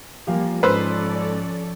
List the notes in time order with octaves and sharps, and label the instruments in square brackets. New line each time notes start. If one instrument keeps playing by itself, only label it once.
[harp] F3 [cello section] G3 A#3 [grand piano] G4 F5 G#5
[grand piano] G#2 E6 B6 [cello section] C#4 A4 D5 [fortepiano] B4 C5